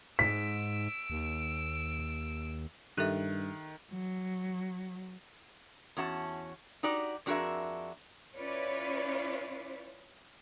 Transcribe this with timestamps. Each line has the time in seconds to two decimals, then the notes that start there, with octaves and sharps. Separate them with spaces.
0.19 G#2 E6 B6 D7
1.10 D#2
2.98 G2 D#3 G4 A4 E5 F#6
3.92 F#3
5.97 E2 C#4 F#4 A5
6.83 D#4 F#4 G4 D5
7.26 F2 D4 F#4 G#4 A#4 E5
8.37 C#4 E4 F4 B4 C#5 D5